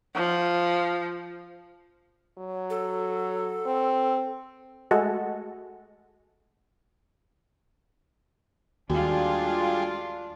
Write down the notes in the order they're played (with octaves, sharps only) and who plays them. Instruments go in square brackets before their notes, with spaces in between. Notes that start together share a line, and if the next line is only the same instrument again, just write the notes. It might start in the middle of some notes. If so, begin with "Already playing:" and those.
[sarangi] F3
[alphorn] F#3
[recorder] A4
[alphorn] C4
[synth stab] G#3 A3 F#4 A4
[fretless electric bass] D#2 [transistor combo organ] G3 G#3 [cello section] D4 F4 [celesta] F#4